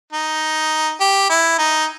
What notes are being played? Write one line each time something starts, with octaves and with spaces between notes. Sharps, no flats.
D#4
G4
E4
D#4